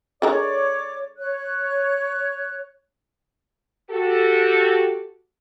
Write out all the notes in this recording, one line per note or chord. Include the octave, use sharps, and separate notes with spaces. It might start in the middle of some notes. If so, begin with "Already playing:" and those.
D3 G#3 A#4 C#5 D5 D6
C#5 F#6
F#4 G4 A4